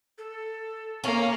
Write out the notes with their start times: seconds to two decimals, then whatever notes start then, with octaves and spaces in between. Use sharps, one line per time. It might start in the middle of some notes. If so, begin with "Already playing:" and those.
0.18 A4
1.04 A#3 C#4